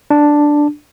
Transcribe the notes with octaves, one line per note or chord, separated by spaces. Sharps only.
D4